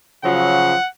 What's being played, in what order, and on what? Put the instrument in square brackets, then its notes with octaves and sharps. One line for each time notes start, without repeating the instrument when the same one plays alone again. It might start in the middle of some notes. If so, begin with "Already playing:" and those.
[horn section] C#3 F3 F#3 [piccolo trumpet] F#5